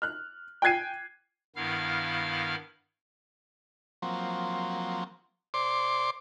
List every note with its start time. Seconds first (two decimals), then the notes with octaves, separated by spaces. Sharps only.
0.02 F6 F#6
0.62 G5 G#5 F#6 G#6 C7 D#7
1.56 G2 D#3 B3 E4 F5 F6
4.02 F3 F#3 A#3 C4
5.54 C5 D5 C6 D6